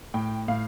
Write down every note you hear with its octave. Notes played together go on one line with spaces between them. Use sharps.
A2 G5
A2 F5